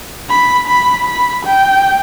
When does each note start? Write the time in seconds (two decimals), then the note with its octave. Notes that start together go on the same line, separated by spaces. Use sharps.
0.29 B5
0.68 B5
1.06 B5
1.46 G5